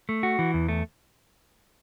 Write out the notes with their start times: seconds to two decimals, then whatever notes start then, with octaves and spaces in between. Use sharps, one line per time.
0.09 A3
0.23 F#4
0.39 E3
0.54 E2
0.68 A3